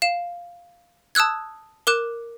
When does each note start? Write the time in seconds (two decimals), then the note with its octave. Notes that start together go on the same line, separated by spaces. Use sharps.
0.02 F5 E7
1.15 A5 D#6 E6 F#6 G#6
1.87 A#4 D6 F#6 E7